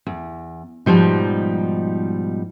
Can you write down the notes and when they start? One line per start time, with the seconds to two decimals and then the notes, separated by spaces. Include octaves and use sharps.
0.06 E2
0.86 G#2 B2 F3 G3 D#4